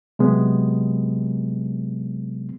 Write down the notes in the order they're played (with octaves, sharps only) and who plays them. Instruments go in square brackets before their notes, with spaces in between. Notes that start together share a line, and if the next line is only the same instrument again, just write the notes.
[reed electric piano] C3 F#3 G#3 B3